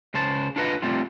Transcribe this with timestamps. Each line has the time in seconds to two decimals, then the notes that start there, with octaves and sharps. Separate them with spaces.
0.14 C#2 C#3 C5 A5
0.56 D4 F4 A4 B4 D5 D#5
0.82 G3 A3 C4 F4